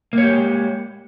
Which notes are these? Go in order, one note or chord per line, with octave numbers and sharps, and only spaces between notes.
G#3 A#3 G4 C#5